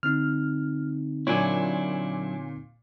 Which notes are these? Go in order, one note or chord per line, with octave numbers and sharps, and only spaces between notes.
D3 C4 D#4 F6
A#2 F#3 D4 E4 C#5 G#5